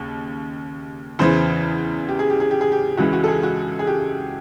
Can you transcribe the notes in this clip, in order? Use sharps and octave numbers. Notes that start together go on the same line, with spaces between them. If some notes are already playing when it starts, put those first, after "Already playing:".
Already playing: D#2 C#3
E2 C#3 E3 C5
G4
G#4
G4
G#4
G4
G#4
G4
C#2 C#3 E3 F#4
F#4
A4
G#4
F#4
G#4
G4